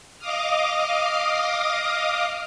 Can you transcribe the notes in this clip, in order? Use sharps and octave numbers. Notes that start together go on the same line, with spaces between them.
D#5 F5 D6 D#6 F6